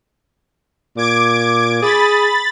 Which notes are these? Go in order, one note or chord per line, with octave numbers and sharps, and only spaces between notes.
A#2 D6 G#6 D7
G#4 B5 A6